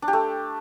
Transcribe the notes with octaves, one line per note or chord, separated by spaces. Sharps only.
D4
G4
A3